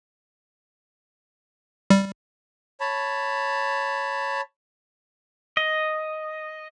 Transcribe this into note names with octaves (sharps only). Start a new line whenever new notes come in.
G3
C#5 A5 B5
D#5